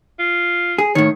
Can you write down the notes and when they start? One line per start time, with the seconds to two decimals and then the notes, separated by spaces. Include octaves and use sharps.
0.20 F4
0.78 G#4
0.95 A2 D#3 C#5